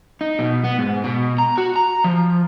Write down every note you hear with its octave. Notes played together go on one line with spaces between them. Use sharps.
D#4
B2
B3
G#2
B2
A#5
F#4
A#5
F3